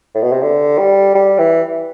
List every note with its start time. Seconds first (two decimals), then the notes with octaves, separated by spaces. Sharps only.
0.15 A2
0.23 B2
0.32 C3
0.43 D3
0.78 G3
1.15 G3
1.39 E3